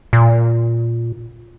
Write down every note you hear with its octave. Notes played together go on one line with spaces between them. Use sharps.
A#2